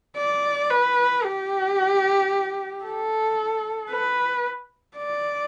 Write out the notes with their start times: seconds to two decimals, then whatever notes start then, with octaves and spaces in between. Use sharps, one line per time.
0.16 D5
0.70 B4
1.24 G4
2.84 A4
3.91 B4
4.97 D5